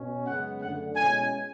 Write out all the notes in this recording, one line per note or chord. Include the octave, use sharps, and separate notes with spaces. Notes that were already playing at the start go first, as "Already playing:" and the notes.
Already playing: B2 C#4
F#2 C#3 G#3 B3 F#5
F#2 D3 A3 D4 F#5
B2 G#3 C#4 E4 G#5